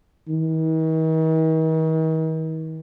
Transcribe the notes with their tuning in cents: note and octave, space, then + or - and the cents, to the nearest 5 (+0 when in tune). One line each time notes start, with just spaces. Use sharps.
D#3 +45